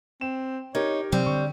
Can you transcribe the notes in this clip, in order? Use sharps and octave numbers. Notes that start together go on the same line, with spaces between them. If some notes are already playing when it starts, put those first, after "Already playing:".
C4 E7
D#4 G4 A#4 C#5 G#6
C3 F#3 G3 C4
D3 C#6